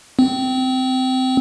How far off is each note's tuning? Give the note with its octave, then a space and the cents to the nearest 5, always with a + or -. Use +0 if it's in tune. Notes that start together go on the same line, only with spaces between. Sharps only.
C4 -20